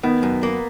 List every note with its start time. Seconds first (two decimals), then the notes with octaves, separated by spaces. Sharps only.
0.03 D#3 B3
0.23 F#2
0.43 A#3